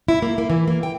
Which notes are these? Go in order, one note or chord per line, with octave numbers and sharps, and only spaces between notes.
E4
A#3
A#3
E3
A#3
G5